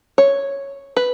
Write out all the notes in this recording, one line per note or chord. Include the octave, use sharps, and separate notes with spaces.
C#5
B4